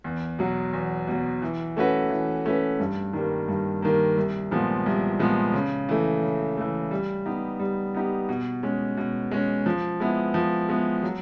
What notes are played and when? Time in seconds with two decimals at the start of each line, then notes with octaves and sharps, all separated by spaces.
0.04 E2
0.39 B2 F#3
0.73 E2
1.07 B2 F#3
1.42 E3
1.77 A3 C#4 F#4 B4
2.10 E3
2.45 A3 C#4 F#4 B4
2.79 G2
3.13 D#3 G3 A#3
3.48 G2
3.82 D#3 G3 A#3
4.17 C2
4.51 A#2 F3 G#3 B3
4.86 C2
5.19 A#2 F3 G#3 B3
5.54 C#3
5.89 E3 A3
6.23 C#3
6.57 E3 A3
6.91 G3
7.26 B3 D#4 G4
7.60 G3
7.94 B3 D#4 G4
8.29 B2
8.63 G#3 C#4
8.97 B2
9.31 G#3 C#4
9.66 F3
10.00 G#3 B3 E4
10.34 F3
10.69 G#3 B3 E4
11.03 F#3